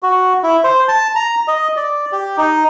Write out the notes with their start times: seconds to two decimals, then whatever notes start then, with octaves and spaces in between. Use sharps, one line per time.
0.03 F#4
0.43 E4
0.64 C5
0.88 A5
1.16 A#5
1.48 D#5
1.76 D5
2.12 G4
2.38 D#4